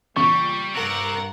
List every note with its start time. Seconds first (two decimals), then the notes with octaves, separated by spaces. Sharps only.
0.16 E2 A#2 C#3 G3 C#6
0.74 G2 C3 A#4 F#5